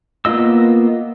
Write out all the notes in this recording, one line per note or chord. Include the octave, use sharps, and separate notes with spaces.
A#3 B3 F4 D#5 E6